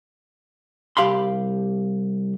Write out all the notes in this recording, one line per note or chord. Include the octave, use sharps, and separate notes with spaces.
C2 G2 G4 F5 B5 C6